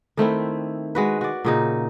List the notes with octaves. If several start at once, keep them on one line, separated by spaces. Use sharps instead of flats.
D#3 A3 C4 E4
G#3 F#4 B4
F#4 D5
A#2 C#3 D#4